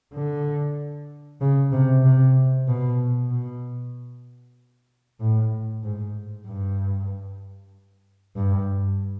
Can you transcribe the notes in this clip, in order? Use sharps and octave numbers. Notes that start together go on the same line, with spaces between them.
D3
C#3
C3
C3
B2
B2
A2
G#2
G2
G2